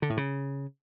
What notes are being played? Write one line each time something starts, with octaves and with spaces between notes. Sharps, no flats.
D3
A2
C#3